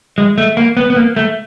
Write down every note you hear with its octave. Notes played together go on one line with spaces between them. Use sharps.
G#3
A3
A#3
B3
B3
A#3
A3